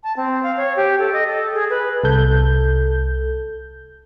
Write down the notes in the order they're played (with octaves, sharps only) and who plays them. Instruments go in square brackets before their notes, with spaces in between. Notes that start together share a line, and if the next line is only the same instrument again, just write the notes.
[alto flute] A5
C4
F5
C#5
G4
A4
D#5
A4
G#4
B4
[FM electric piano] C2 A4 G6